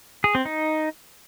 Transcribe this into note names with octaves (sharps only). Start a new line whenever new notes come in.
G#4
C4
D#4